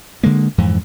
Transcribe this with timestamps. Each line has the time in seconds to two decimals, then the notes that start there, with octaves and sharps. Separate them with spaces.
0.23 D3 G#3 A#3
0.58 F2 G#2 E3